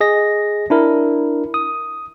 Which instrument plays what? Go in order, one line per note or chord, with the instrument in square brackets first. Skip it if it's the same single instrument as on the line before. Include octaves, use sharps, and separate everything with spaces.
[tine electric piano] G#4 D#5 A#6
D4 E4 A#4
D#6